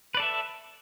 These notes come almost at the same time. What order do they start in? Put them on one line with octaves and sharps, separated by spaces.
B4 D5 A4 E5